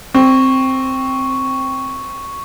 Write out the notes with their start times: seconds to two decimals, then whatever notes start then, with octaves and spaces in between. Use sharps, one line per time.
0.15 C4 C#6